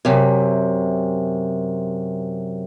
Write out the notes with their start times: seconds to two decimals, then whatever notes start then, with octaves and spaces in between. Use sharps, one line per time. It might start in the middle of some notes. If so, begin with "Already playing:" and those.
0.05 F#2 C3